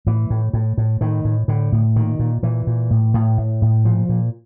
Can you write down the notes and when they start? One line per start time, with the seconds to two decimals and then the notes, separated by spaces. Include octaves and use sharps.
0.07 A2 E3
0.30 A2
0.53 A2
0.78 A2
1.01 A2 D#3
1.25 A2
1.48 A2 D3
1.72 A2
1.96 A#2 D#3
2.19 A#2
2.43 A#2 E3
2.67 A#2
2.91 A2
3.14 A2
3.38 A2
3.62 A2
3.85 A#2 F3
4.09 A#2